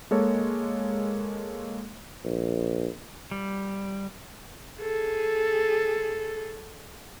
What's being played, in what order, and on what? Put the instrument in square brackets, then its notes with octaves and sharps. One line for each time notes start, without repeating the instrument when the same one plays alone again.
[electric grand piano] G#3 A#3 A4 C#5
[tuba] A#1
[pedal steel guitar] G3
[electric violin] G#4 A4